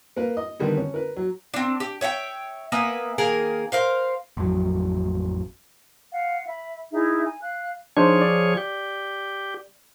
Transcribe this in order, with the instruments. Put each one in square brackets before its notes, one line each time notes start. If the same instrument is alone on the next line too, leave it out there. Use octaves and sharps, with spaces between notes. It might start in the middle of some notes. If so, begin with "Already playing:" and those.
[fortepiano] A#3 A#4 B4
D#5
D3 D#3 G3 B3
C#4
A#4 B4
F#3
[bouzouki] C4 D4
G4
C#5 E5 F#5 G5
A#3 B3 E5 G#5
D#3 A#3 G#4 A#4
A#4 C5 F5
[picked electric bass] A1 F2 F#3
[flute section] F5 F#5
E5 B5
D#4 E4 G#4 E5
G#5
F5 F#6
[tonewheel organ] F3 G#4 C#5 [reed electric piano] D4 D#4 C5
[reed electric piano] D5
[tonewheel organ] G4